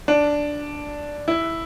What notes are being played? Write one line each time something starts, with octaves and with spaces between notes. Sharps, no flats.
D4
E4